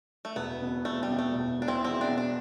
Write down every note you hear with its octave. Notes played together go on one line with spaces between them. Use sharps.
A3
E1 B3
B2
E1 A3
G3
B2
A3
E1
E1 D4
C4 E4
E2 C4 E4
D4
B2
D4